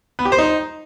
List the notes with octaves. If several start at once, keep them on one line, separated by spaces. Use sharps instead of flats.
B3
G4
C5
D#4